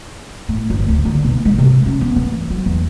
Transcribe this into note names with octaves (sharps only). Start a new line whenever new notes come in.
A2
G1
D2
D3
B1
G#3
C3
C#4
B3
E3
F#3
E2